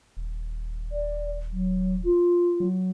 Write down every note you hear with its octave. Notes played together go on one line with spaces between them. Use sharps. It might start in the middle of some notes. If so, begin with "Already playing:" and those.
D#1
D5
F#3
F4
F#3